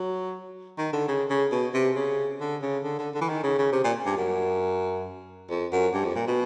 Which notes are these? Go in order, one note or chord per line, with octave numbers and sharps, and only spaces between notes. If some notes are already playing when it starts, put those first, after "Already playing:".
Already playing: F#3
D#3
D3
C#3
C#3
B2
C3
C#3
D3
C#3
D3
D3
D3
E3
D#3
C#3
C#3
C3
A#2
G2
F#2
F2
F#2
G2
F2
A#2
B2